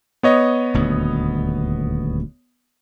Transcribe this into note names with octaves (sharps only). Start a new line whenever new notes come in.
B3 C#5 D#5
D#1 D2